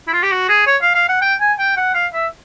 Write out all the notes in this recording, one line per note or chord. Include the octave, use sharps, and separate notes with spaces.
E4
F4
G4
F#4
G#4
C#5
F5
F5
F#5
G5
G#5
G5
F#5
F5
E5